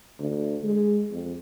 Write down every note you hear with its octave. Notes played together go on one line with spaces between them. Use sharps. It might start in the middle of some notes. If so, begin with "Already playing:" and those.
D2
G#3
F2